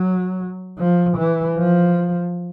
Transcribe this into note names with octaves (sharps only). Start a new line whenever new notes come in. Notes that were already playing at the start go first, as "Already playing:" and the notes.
Already playing: F#3
F3
E3
F3